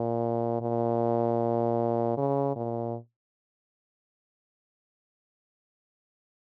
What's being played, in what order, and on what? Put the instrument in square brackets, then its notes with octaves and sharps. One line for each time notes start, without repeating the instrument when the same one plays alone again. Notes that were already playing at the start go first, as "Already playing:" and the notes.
Already playing: [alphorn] A#2
A#2
C#3
A#2